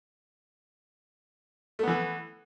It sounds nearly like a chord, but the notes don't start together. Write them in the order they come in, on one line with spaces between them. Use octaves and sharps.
A3 B3 E3